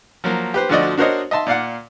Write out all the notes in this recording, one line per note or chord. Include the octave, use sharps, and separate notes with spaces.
F3 F#3 A#3
G4 B4 C5
D2 D3 F3 F#4 D5 D#5
D4 F#4 A#4 C5 C#5 D#5
D#5 E5 A5 C6
A#2 D5 F5 F#5